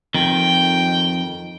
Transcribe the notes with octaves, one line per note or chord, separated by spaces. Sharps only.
F2 D#3 G5